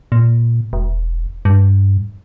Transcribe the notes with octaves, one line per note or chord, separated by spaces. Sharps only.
A#2
E1
G2